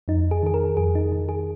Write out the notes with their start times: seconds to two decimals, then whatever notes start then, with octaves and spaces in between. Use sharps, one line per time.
0.08 F2 D#4
0.31 G#4
0.43 D#3 G#4
0.54 A#4
0.77 F2 G#4
0.95 D#4
1.12 D#3
1.29 G#4